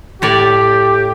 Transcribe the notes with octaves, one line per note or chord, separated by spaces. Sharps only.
A2 G4 C#5 D5